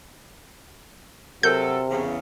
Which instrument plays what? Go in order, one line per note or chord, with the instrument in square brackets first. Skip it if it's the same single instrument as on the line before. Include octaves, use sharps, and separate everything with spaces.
[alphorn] C3 [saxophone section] F#3 A4 [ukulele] A#4 [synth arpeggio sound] G6
[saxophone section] E2 C#3